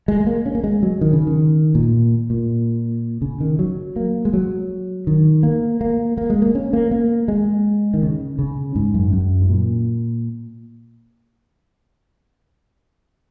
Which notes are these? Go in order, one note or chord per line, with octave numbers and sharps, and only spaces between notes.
G#3
G#3
A#3
C#4
A#3
G#3
F#3
D#3
C#3
D#3
A#2
A#2
C#3
D#3
F#3
A#3
G#3
F#3
D#3
A#3
A#3
A#3
G#3
A#3
C#4
A#3
A#3
G#3
D#3
C#3
C#3
G#2
F#2
F#2
G#2
A#2